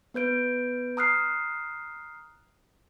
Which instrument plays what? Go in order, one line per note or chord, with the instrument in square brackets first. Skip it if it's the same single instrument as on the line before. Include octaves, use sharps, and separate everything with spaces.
[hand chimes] B3 B4 G6 D7
A#5 D#6 F6 F#6 C7